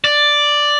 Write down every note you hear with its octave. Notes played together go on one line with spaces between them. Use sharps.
D5